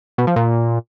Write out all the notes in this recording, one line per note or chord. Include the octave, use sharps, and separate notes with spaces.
B2
F3
A#2